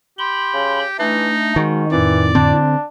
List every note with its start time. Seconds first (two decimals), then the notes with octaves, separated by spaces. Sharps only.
0.19 G4 B5 C6
0.53 C#3
0.99 E3 A3 D4 D#4
1.56 G#2 D#3 G#3 F#4
1.92 F2 A2 E3 D5
2.35 D3 C4 D4